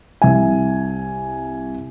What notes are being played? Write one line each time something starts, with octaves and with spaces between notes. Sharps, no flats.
C2 E5 G#5